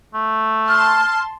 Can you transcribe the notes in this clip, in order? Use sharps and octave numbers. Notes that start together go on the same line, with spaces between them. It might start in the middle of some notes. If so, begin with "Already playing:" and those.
A3
A5 C6 F6